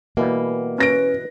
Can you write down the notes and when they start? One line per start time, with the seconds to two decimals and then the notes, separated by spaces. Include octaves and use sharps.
0.17 B2 E3 G3 A#3
0.78 C#4 B4 A#6 D7